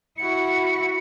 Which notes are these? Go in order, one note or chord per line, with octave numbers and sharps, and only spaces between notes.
E4 F#4 C#7